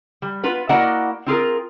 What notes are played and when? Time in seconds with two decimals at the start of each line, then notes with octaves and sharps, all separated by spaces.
0.22 G3
0.43 B3 F4 B4
0.69 A#3 E4 F#4 D5 D#5 F#5
1.26 C4 F4 G#4 A#4